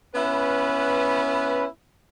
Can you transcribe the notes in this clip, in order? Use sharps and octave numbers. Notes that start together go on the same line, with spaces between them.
B3 C#4 E4 B4